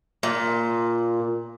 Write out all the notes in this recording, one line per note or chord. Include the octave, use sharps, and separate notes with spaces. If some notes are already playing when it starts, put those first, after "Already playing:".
A#2